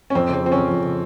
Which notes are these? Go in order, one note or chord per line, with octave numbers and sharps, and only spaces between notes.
C#4
F2 C4
C#3 C4
F3 C4
C#4
F2
F2
C#3